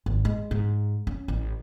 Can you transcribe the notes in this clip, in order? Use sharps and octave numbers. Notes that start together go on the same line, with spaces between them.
G#1
G#3
G#2
C#4
A1